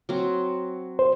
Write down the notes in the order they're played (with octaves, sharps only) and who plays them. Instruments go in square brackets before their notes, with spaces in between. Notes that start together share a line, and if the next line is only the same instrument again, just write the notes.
[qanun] F#3 C4
[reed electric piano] C5